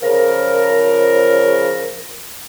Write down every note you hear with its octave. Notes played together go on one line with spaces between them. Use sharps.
C#3 F3 A#4